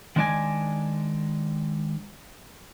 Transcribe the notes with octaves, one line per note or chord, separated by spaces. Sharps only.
D#3 G#3 D4 D5 D#5 G#5